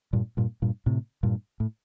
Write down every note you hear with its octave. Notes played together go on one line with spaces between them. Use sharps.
G2 A#2
G2 A#2
G2 A#2
A2 C3
G2 A#2
A2